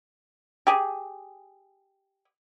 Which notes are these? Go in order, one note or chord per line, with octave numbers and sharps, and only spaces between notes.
G4 G#4